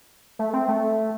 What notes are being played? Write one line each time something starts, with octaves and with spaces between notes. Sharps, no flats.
A3
C4
A3